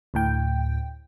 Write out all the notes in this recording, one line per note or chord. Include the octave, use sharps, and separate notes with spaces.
D2 A2 G5